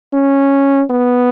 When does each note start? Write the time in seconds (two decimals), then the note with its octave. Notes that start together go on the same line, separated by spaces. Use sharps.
0.13 C#4
0.90 B3